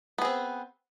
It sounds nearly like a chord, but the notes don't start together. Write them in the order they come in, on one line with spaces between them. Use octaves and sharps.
B3 G#4 C4